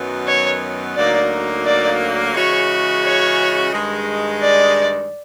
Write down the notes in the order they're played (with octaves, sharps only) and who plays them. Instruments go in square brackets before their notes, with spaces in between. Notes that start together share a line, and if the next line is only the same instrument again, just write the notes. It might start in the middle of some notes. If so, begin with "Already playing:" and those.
Already playing: [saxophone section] F#2 D#3 F#3 B3
[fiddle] C#5
[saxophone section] D2 D3 F#3 A#3 D#4 [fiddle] D5
[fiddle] D5
[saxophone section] C#3 E3 G#3 C#4 F#4 [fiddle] C#5
[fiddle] C#5
[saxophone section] G2 D#3 G#3
[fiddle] D5